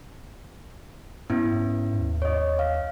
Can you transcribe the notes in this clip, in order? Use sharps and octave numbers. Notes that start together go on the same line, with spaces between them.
G#2 B3 C#4 E4
D#2
C#5 D#5
F5